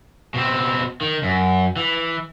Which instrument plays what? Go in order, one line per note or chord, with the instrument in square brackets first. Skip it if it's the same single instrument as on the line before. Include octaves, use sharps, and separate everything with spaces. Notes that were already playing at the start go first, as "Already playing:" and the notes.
[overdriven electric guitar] B2 C4
D#3
F#2
E3